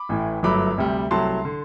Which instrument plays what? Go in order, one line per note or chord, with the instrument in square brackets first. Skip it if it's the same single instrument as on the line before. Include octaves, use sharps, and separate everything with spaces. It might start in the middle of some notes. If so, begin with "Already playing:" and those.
Already playing: [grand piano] B5 D6
A1 A2 E3
G1 F#2 F#3 A3 B5 D6
D2 C3 G3
C2 C3 F#3 A3 A5 C6
D3